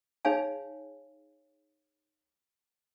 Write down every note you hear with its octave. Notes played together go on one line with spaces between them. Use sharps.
D#4 G#4 C#5 F5 G#5